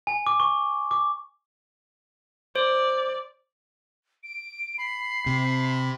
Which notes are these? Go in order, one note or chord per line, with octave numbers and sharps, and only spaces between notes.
G#5
D6
C#6
D6
C5 D5
D7
B5 C7
C3